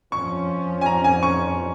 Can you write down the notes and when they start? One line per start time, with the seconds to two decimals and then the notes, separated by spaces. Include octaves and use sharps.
0.12 F2 F3 C#4 C#6
0.81 G#5
0.86 A#5
1.04 G#5
1.23 C#6